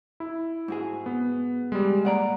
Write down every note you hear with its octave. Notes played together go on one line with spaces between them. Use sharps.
E4
G#2 F#4 G#4
B3
G3 G#3
A#2 D5 F#5 A#5